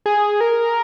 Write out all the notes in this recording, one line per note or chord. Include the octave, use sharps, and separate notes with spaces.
G#4
A#4